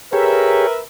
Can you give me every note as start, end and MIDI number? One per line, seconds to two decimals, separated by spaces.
0.13 0.67 67
0.13 0.67 68
0.13 0.80 70
0.13 0.80 71
0.13 0.67 73
0.13 0.80 76